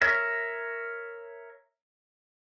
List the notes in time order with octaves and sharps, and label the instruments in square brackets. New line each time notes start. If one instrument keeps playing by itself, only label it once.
[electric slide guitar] A#4 C#5 E5